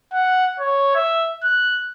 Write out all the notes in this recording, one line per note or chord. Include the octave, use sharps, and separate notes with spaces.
F#5
C#5
E5
F#6